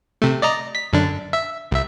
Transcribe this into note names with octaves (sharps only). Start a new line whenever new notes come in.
C3 A3
D5 D#5 A#5
B6
F#2 D3 D4
E5
C2 E5